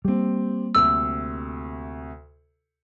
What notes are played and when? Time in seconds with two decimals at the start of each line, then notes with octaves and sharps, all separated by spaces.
0.05 G3 A#3 C4 G4
0.75 D2 C3 E6